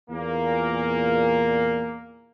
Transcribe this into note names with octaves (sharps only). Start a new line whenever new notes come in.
E2 A#2 A#3